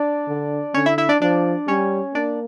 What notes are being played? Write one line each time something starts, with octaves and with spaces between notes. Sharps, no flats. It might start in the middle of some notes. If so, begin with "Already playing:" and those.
Already playing: D4 D5
D3
D3 C#4 C#5
E4 E5
E4 E5
D4 D5
F3 D4 D5
G3 C#4 C#5
A#3 D4 D5